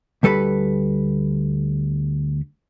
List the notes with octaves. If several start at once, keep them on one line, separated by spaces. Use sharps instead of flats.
D2 G3 A4 B4 B5